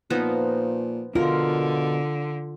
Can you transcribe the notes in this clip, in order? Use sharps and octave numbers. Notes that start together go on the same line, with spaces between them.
A#2 F3 B3 D#4
B2 D3 F4 A#4